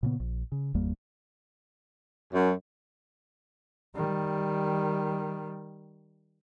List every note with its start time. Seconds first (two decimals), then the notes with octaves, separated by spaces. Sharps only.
0.03 A#2 C#3 B3
0.20 A#1
0.52 C#3
0.74 G1 E2 G3 A#3
2.33 F#2
3.95 D#3 G3